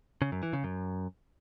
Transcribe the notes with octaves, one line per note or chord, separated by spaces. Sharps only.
C#3
F#2
E3
C#3
F#2